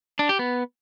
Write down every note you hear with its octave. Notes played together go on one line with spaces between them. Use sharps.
D4
G4
B3